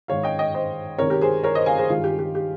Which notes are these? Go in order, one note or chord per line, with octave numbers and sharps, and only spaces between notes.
G#2 D#3 G#3 C#5 F5
D#5 G5
D#5 G5
C5 D#5
C3 D#3 G#3 A#4 C#5
G4 A#4
G#4 C5
A#4 C#5
C5 D#5
F5 G#5
G#4 C5
G2 D#3 G#3 F4
G4
G4
G4